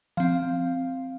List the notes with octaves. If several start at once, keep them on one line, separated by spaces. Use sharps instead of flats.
F3 C4 F5